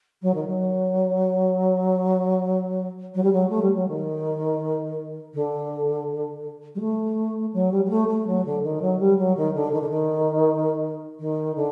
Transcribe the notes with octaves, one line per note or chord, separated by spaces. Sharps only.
F#3
D#3
F#3
F#3
G3
F#3
A3
G3
F#3
D#3
D3
G3
A3
F#3
G3
G3
A3
A3
F#3
D3
D#3
F#3
G3
F#3
D#3
D3
D#3
D3
D#3
D#3
D3